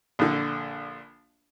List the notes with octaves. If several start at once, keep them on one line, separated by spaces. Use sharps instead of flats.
A#1 D3